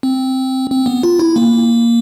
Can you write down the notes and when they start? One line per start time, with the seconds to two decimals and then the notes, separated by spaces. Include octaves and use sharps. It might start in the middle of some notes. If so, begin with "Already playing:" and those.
0.03 C4
0.70 C4
0.86 B3
1.03 F4
1.19 E4
1.36 A#3